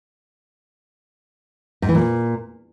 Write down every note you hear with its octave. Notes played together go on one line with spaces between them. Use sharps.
G#2
E3
A#2